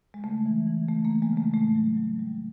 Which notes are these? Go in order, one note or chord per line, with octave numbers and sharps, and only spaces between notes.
G#3
C#3 A3
E3
E3
C#3 A3
A#3
E3
G#3
C#3 A3
A2 A3
F#3
F#3
G3